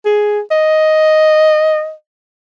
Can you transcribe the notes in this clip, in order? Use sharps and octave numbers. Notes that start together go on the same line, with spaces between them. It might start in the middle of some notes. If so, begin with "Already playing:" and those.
G#4
D#5